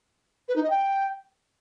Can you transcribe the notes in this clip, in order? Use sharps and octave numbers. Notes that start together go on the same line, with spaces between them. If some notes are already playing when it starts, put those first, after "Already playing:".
B4
D#4
D#5
G5